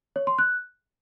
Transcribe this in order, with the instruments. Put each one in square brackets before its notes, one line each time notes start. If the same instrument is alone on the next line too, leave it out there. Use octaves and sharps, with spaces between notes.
[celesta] C#5
C6
F#6